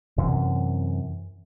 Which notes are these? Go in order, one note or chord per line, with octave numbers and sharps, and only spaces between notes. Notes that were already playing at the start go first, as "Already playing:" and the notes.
F#2 C3 E3